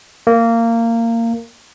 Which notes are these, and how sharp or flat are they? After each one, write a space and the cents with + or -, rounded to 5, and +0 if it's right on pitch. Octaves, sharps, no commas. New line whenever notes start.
A#3 -20